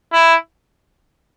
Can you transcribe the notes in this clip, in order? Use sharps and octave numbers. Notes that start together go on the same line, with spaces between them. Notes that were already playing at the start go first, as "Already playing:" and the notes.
E4